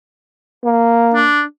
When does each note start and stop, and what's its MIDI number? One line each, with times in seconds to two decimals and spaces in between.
0.64 1.27 58
1.14 1.42 62